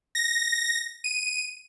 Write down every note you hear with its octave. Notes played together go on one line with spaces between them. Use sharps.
A#6
D#7